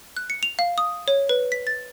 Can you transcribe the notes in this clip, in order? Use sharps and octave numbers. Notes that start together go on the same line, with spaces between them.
F#6
C#7
F7
F5
D#6
C#5
B4
B6
A6